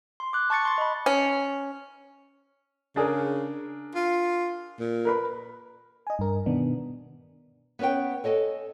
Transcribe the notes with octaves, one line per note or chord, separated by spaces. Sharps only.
C6
D6 F#6
A5 C#6 A6 C#7
C6 A6
D#5 B5
C#4
C#3 D4 G#4 A#4
F4
A#2
A#4 B4 B5
D#5 G#5
G2 A#4
B2 D#3 B3 D4
B3 C#4 B4 C#5 G5
A4 C#5 D#5 G#5